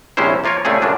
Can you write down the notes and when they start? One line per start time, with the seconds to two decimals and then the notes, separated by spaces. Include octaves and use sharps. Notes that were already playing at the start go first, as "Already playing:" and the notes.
0.17 A#1 C3 G#3 C#4 E4 C5
0.44 F3 A#3 F4 A#4 C#5
0.65 A#2 C#3 A3 C4 G#4
0.82 F#2 A#2 C#3 F#3 D4 F4